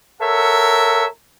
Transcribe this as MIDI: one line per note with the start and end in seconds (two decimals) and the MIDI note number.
0.21 1.05 69
0.21 1.05 70
0.21 1.05 73
0.21 1.05 76
0.21 1.05 78